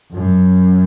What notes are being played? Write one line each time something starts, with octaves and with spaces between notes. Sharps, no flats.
F#2